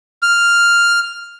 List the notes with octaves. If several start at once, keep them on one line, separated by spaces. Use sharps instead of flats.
F6